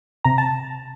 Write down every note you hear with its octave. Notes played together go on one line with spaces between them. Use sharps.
C3 A#5
A5